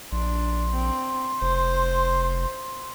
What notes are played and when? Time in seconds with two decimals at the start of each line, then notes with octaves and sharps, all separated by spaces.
0.12 A#1 D4 C6
0.72 C4
1.41 F1 C5